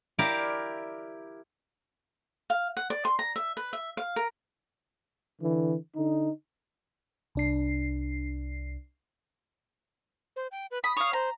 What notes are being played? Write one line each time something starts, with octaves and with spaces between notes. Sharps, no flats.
E4 G4 A#4 D5 F5
F5
F#5
D5
C6
A#5
E5
B4
E5
F5
A#4
D3 E3
D3 D#4
C2 D4 C7
C5
G5
B4
B5 D#6
C#5 F5 D#6
C5 A#5